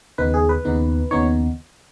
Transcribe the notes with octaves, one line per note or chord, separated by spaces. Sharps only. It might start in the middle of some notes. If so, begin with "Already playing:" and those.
D#2 C#3 B3 D#4 B4
G#4
B4
D#2 C#3 B3 D#4
D#2 C#3 B3 D#4 C#5